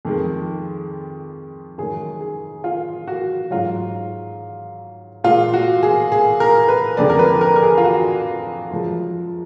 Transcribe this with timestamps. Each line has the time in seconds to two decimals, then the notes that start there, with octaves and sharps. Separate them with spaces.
0.05 F2 D#3 G#3
1.78 F#2 D#3 G#3 G#4
2.21 G#4
2.64 F4
3.08 F#4
3.51 G#2 F#3 F4
5.24 A#2 G#3 F4
5.53 F#4
5.83 G#4
6.12 G#4
6.40 A#4
6.68 B4
6.97 F2 D3 G#3 D5
7.10 A#4
7.19 B4
7.41 A#4
7.56 A#4
7.63 G#4
7.78 F4
7.84 F#4
8.71 F#2 F3 G#3